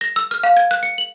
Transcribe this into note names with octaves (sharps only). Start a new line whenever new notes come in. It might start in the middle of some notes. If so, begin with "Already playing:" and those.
A#6
E6
F6
F5
G#6
F#6
C#7
F#7